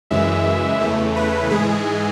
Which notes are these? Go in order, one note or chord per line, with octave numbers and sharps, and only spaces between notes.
F#2 C#3 E3 G#3 E5
E2 C#3 E3 A3
B4
G#2 E3 G#3 G#4